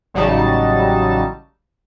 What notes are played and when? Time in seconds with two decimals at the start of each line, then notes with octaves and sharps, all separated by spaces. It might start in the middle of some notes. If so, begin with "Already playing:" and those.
0.14 A1 C#3 F#3 G3 D#4 A5